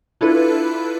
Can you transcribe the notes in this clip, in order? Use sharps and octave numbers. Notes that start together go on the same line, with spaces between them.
D4 E4 F4 A4 B4